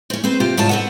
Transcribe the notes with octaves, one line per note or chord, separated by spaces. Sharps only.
C4 C#4
C4 B4 C5
C3 F4 G4
G#2 F4 C#5 A5
C4 B4 F#5